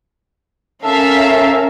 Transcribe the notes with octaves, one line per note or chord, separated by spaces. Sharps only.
C#4 A4 A#4 E5 F5